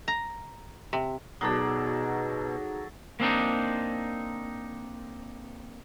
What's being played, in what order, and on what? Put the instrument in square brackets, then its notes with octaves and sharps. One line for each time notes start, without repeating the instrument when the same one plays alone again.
[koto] A#5
C3
[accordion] B2 [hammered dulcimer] F#3 A4 D5 [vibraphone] D#4 F#4 G#4
[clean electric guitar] A#3 C4 D4 D#4